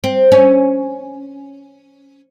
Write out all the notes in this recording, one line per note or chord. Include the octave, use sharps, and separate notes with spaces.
C4
C#4